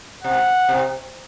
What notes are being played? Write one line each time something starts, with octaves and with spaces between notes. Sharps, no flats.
C3 F#5
C3